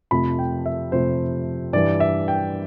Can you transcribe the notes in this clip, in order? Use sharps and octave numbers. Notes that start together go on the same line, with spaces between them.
F2 C3 F3 A3 B5
G5
E5
F2 C3 F3 A3 C5
G2 E3 G3 D5
E5
G5